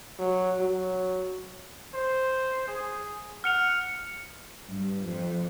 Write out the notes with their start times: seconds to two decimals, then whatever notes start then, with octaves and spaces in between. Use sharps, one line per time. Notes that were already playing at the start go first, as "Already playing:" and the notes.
0.19 F#3
0.59 F#3
1.94 C5
2.68 G#4
3.44 F#5 F6 C#7 F7
4.69 G2
5.03 F2